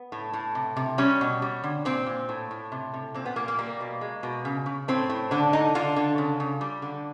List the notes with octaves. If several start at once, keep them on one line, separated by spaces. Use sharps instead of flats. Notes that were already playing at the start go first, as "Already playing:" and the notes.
Already playing: B3
A2
A2
C3
C3
G3 C#4
B2
G3
D3
A#2 C4
A#2
A2
A2
C3
C3
A#2 C4
B3
A#2 A#3
A#3
G3 A#3
B2
G#3
B2
C#3
C#3
A2 C4
A2
D3 D4
D3 D#4
D3 F4
D3
C#3
C#3
G3
D3